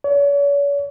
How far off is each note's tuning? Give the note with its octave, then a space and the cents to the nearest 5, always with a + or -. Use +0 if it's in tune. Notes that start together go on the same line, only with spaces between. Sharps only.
C#5 +40